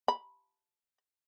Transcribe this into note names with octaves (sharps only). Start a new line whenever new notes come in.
B5